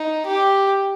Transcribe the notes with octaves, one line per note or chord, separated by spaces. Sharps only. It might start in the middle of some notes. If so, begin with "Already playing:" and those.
Already playing: D#4
G4